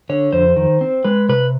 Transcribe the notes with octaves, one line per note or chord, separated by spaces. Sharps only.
D3 C#5
F2 C5
D#3
C4
G#3 B4
C3 B4